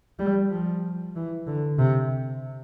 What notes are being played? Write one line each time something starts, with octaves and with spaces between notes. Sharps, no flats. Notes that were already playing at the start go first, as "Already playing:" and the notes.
G3
F3
E3
D3
C3